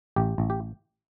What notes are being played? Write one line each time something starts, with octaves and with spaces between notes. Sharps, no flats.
A1 G4
A1
G4